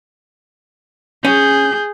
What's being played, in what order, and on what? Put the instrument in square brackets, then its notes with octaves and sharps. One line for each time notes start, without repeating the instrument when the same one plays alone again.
[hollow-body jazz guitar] C#4 [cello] G#4 [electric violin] G6